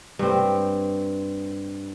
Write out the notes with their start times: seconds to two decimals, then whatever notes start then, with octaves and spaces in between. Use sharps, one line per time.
0.19 G2 C4